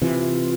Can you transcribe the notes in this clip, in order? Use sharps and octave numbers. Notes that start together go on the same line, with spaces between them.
C3 E3 F4